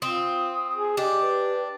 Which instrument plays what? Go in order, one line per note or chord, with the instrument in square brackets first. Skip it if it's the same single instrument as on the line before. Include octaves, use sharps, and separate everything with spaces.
[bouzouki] C4 [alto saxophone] F4 [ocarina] D#6
[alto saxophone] G#4
[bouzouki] D4 [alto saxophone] G4 [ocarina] D#5
[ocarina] B4